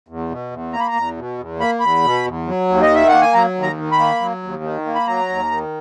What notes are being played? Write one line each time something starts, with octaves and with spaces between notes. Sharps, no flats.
E2
B2
E2
A#3 A#5
B5
A#5
E2
B2
E2
A#3 B5
E2 B5
B2
E2
F#3
D#2
D#5
D#3 E5
A#3 F#5
G#5
F#3 A#5
D#2
A#5
D#3
B5
A#3
F#3
D#2
D#3
A#3
B5
F#3 A#5
D#2
D#3